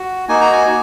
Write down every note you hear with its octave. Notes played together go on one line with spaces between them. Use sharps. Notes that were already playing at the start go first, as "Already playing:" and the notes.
Already playing: F#4
A#3 D#4 F#4 G#5
A#5
G#5
F#4